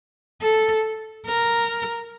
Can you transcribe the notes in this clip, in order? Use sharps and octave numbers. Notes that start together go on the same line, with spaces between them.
A4
A#4